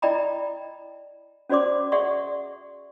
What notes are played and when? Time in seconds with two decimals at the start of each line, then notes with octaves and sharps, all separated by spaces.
0.02 E4 D5 D#5 G5 A#5 B5
1.49 C#4 F#4 C5 D5 C6 D6
1.92 G#4 D5 E5 F#5 C6 C#6